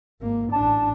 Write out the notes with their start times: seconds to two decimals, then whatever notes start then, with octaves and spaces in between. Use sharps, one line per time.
0.21 G#1 A#3
0.52 A1 D4 A5